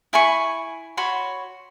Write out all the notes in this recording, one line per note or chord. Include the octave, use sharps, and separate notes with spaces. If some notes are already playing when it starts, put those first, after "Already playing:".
E4 G#5 B5 C#6
F#4 C#5 B5 C6